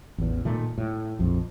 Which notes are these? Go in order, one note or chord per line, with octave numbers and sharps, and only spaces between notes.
A1 E2
A#2 D#3 A3
A2
A#1 F2